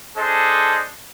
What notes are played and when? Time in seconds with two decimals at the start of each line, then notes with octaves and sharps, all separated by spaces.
0.17 D4 G#4 A4 C5 D#5